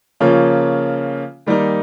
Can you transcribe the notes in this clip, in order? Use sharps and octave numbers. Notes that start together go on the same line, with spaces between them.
C#3 F3 A#3 C#4
D#3 G3 A#3 D#4